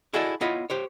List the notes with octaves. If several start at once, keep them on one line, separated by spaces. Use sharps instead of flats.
E4 F#4 G#4 A4 D5 D#5
B3 E4 F4 C#5 D#5 B5
G4 C5 C#5